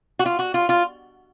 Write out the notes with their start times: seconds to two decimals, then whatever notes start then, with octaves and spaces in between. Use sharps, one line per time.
0.19 F#4
0.26 F4
0.39 F#4
0.54 F4
0.69 F4